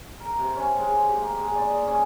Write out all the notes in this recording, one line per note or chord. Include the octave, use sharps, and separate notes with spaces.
A#4
C3
C#4
G#3
D6
G4
A#3
G#3
D5
D#5
C#4